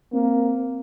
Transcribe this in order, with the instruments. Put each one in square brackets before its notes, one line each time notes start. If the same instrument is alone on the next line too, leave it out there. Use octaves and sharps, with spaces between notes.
[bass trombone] A#3 [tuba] C4